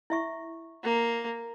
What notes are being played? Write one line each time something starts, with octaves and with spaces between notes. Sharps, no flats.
E4 E5 C#6
A#3